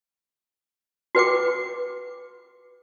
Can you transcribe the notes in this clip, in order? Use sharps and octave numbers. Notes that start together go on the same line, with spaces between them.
F#4 B4 G5 D6